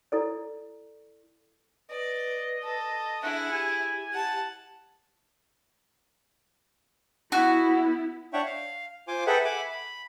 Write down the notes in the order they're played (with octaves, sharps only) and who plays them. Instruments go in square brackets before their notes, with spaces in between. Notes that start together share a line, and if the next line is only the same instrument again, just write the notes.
[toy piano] E4 A4 D5
[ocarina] B4 [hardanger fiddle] D5 [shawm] D#5
[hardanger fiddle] A4
[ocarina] D4 [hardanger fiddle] E4 G#4 [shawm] F#5
[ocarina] G4 [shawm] G#5
[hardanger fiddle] F#5 A5
[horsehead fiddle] B3 E4 [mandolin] F#4
[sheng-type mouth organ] D4 C#5 E5 F#5 G5 C#6
F5
F4 C5 G#5 C6 D6
G#4 A4 B4 E5 F#5 G5
E5 F#5 G#5 B5 D6
B5